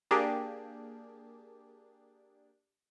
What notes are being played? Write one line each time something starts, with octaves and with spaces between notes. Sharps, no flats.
A#3 D4 G4 G#4